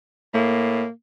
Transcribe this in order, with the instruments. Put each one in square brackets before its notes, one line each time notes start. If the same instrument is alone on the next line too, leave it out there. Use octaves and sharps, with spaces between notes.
[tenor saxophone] A2 [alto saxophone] A#3